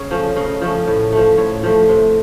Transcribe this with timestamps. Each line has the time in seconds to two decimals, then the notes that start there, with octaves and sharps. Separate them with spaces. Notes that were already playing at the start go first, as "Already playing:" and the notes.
Already playing: C#3 C#5
0.11 F3 A3 C#4
0.36 C#3 D#5
0.62 F3 A3 C#4
0.87 A2
1.12 F3 A3
1.38 A2 C#5
1.63 F3 A3
1.89 C3